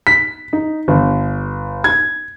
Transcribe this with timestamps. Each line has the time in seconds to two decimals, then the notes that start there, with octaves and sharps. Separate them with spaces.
0.07 B6
0.53 D#4
0.88 G1
1.84 G#6